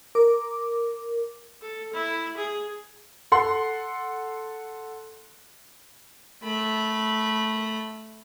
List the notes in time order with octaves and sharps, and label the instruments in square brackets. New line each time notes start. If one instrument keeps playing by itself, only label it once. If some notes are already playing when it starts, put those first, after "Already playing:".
[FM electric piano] A#4 D6
[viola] A4
E4
G#4
[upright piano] A4 F#5 C6
[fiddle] A3 B5